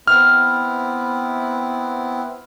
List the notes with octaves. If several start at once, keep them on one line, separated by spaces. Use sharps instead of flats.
B3 C4 E4 F6